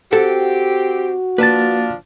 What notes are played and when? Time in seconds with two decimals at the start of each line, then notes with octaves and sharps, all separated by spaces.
0.13 C4 F#4 G4 A4 F#5
1.38 F3 A#3 D4 F4 B4 A5 A6